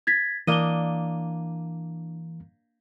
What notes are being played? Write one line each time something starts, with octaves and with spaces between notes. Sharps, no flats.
G#6 A6 B6
E3 A#3 D4 D#5 D#7 G7